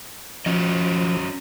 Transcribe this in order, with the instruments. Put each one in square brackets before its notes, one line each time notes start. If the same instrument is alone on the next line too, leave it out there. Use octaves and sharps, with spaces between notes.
[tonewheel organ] F3 [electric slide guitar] C#4 F#4 D#5